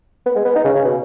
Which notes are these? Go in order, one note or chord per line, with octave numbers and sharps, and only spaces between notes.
B3
G#3
B3
D#4
C#3
C#3
B2